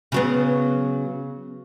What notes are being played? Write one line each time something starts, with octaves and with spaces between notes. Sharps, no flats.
C#3 F#3 B3